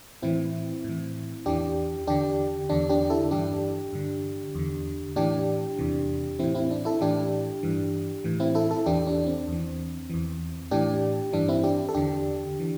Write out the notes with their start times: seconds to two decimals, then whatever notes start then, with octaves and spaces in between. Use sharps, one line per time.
0.22 A2 E3 C4 E4
0.84 A2 E3
1.46 E2 E3 D4 G4
2.07 E2 D3 D4 G4
2.69 E2 D3 D4
2.89 D4 G4
3.10 E4 A4
3.31 G2 E3 D4 G4
3.93 G2 D3
4.55 E2 D3
5.16 A2 E3 D4 G4
5.78 E2 C3 E3
6.39 A2 E3 C4 E4
6.55 C4 E4
6.71 D4
6.85 E4 A4
7.01 A2 E3 D4 G4
7.63 G2 E3
8.24 A2 E3
8.40 C4 E4
8.55 E4 A4
8.71 E4 A4
8.86 E2 E3 D4 G4
9.07 D4
9.27 C4
9.48 E2 E3
10.10 E2 E3
10.71 A2 E3 D4 G4
11.33 G2 E3 D4
11.48 C4 E4
11.64 D4 G4
11.89 A4
11.94 E2 D3 D4 G4
12.60 E3